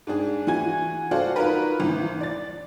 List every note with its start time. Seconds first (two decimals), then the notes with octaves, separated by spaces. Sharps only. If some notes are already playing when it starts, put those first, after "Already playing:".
0.07 G#2 D4 G#4
0.47 E3 F#4 G#5 G#6
1.11 F#4 A4 C5 D5 F5 F#5
1.36 D#4 F4 F#4 A#4 B4
1.80 G#1 E3
2.21 D5 A6